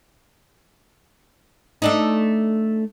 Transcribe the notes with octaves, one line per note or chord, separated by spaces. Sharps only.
A3 D4 D#4